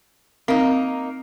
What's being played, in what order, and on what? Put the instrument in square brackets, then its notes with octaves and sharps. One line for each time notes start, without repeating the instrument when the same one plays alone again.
[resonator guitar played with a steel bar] A#3 D#4 [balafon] C4